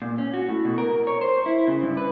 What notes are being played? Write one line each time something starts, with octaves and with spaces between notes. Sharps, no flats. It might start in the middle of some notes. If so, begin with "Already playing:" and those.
A#2
C#4
F#4
A2
B2
A#4
C#5
C5
E4
C#3
G2
B4